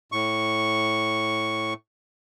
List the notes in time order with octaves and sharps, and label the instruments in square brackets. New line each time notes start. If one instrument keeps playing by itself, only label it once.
[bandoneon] A2 C#6